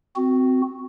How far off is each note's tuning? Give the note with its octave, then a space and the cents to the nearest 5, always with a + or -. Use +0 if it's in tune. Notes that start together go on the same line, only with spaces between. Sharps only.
C4 -20 F#4 +0